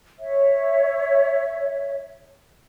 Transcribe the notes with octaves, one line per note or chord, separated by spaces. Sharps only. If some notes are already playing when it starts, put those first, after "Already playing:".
C#5 E5